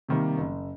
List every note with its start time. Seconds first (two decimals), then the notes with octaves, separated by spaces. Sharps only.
0.09 C3 D#3 G3 A#3
0.38 F#1